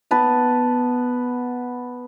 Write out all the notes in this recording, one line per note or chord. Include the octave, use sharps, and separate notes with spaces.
B3 B4 A5